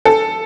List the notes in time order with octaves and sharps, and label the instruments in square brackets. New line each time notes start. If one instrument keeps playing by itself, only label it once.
[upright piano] A4